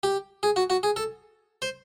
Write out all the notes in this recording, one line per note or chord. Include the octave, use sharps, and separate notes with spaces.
G4
G#4
F#4
F#4
G#4
A4
C5